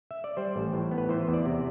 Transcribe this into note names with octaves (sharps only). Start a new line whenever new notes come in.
E5
D5
G3 C5
A1
A2
B3
B4
E3 C5
E2
D5
C3